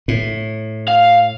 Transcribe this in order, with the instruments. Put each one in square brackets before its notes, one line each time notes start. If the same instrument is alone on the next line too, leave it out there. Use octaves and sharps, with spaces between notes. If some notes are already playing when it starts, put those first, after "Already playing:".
[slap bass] A2
[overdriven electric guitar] F5